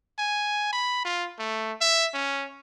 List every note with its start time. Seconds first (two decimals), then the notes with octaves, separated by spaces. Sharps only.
0.18 G#5
0.73 B5
1.05 F4
1.39 A3
1.81 E5
2.14 C#4